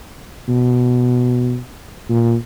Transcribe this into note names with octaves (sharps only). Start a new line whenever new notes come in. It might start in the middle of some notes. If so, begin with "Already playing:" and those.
B2
A#2